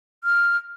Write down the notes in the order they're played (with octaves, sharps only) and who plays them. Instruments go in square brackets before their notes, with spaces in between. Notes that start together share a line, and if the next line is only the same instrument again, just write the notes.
[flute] F6